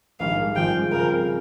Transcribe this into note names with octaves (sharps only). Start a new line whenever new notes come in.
A#1 G#2 D#3 G3 F5
G#1 G2 F3 G#3 G5
C#3 F3 C4 F4 G#4 A#4